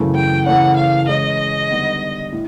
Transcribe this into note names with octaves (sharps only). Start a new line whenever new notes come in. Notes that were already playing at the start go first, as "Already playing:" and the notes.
Already playing: F#2 C#3 E3 A3
G5
C#3 E3 A3 C#4 F#5
F5
E3 G#3 C#4 D#5
D3 G3 B3 D#4
A2